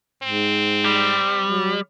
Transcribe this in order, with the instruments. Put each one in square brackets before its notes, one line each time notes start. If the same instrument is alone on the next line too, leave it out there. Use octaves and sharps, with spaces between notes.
[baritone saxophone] G#2 [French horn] C4
[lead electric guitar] G3
[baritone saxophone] F#3